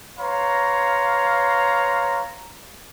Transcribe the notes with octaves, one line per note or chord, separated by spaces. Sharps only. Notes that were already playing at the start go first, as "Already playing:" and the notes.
B4 C#5 F5 A#5 C6